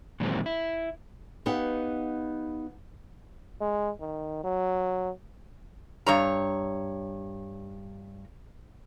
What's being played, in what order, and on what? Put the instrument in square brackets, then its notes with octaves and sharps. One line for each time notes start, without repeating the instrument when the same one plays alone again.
[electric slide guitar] A#2 D#3 E3 F#3 G#3 C4
E4
[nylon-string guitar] B3 D#4 G4 F5 F#5
[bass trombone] G#3
D#3
F#3
[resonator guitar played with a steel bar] G2 C#5 A#5